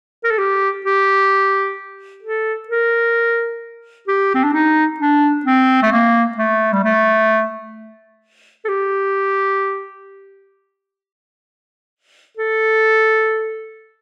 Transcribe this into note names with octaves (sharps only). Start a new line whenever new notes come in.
A#4
A4
G4
G4
A4
A#4
G4
C4
D4
D#4
D4
C4
A3
A#3
A3
G3
A3
A4
G4
A4